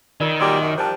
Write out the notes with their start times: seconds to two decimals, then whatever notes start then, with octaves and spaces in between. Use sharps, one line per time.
0.21 D#3 F4 A#4 D5
0.40 A#2 F#3 G3 A#4 C6 D6
0.61 F#2
0.78 D#3 F3 G3 C5 A5